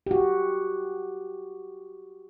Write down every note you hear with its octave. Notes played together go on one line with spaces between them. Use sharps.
F#4 G4